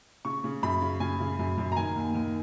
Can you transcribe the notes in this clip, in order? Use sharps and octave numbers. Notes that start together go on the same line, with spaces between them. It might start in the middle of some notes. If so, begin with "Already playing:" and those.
C#3 C#6
C#3
F#2 B5
C#3
C#3 G#5
C#3
F#2
F#2
A#5
D#3 G#5
D#2
D#3